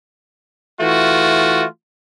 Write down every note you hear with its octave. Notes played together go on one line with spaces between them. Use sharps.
E3 A3 F4 F#4